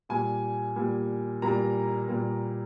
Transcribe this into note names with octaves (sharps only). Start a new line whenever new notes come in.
A#2 G3 A#3 G#5
A#2 G3 A#3
A#2 G3 A#3 A#5
A#2 G3 A#3